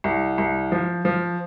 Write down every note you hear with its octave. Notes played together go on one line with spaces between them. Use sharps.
C2
C2
F3
F3